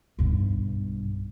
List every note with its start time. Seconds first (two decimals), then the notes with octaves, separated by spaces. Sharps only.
0.19 B1 G2